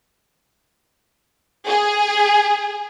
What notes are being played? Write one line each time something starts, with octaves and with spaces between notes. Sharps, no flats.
G#4